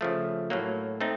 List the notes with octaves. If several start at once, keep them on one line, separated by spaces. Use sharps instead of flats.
C#3 F3 A3
A2 F#3 A#3
A3 C4 D#4